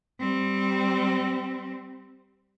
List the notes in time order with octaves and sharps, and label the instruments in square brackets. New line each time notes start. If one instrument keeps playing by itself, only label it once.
[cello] G3 C4